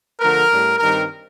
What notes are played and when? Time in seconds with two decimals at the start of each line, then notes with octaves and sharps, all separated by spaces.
0.20 D3 F3 A3 A#4
0.49 A2 G3 D4
0.78 G2 D#3 G3 C4 A#4